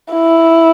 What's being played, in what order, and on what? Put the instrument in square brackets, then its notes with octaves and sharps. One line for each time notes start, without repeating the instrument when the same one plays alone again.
[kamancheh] E4